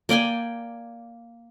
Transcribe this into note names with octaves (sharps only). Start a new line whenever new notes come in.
A#3 D5 G5 G#5